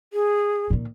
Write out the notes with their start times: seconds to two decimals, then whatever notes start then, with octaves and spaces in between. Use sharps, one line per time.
0.13 G#4
0.70 A#2 D#3